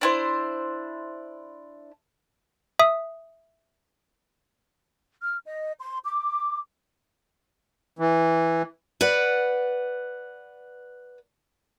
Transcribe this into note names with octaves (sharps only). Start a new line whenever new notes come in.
D4 E4 C5
E5 D#6
F6
D#5
C6
D6
E3
B4 D5 F#5